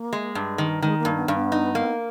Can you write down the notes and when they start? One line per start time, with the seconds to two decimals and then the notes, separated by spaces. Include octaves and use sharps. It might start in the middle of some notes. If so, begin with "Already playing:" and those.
Already playing: A#3
0.13 G#3
0.35 G2
0.58 D#3
0.82 D#3 G#3
0.99 A#3
1.05 G2
1.16 B3
1.28 G2
1.34 B3
1.52 D#4
1.75 A#3